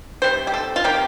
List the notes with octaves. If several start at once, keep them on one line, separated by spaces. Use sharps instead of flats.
C3 G3 C5
G4
A4
F4
C3 G3 A#3 G4